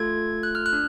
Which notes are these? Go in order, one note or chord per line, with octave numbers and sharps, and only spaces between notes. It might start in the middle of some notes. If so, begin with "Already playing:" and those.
Already playing: A3 F4 A4 G#6
F#6
F6
F#6
D4